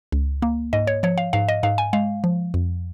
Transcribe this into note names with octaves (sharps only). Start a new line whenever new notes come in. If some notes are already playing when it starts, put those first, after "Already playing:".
C#2
A#3
G#2 D#5
C#5
F3 C#5
F5
G#2 F5
D#5
G#2 F5
G#5
G#3 F5
F3
F2